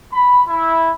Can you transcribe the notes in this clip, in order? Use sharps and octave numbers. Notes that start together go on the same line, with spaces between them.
B5
E4